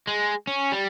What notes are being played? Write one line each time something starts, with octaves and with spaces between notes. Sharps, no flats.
G#3
C#4
G3